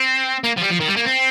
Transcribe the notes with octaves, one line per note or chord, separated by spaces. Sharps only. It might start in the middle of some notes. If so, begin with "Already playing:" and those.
Already playing: C4
A#3
F3
G3
F3
D#3
G3
A#3
C4